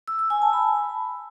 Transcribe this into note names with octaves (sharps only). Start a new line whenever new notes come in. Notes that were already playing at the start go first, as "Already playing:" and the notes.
E6
E6
G#5
A5
B5